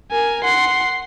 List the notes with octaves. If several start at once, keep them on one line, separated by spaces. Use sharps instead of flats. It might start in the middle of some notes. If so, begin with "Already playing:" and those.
A#4 G#5
F#5 C6